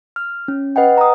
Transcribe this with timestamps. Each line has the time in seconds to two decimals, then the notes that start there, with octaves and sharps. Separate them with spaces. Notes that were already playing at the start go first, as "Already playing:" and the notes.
0.16 F6
0.48 C#4
0.76 B4 D#5 F#5 G5
0.98 A#5 D#6